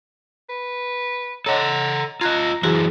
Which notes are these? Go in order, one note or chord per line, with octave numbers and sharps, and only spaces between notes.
B4
A4 C#5 D#5 F#5 A#5
F4 D#5 A#5 F#6 G#6
F#2 E3 E4 F#4 G#4 C5